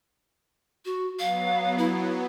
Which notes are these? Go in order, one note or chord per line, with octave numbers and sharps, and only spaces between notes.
F#4
F#3 B3 F5
E4